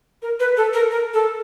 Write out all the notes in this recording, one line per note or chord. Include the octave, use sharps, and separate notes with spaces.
A#4
B4
A4
A#4
A#4
A4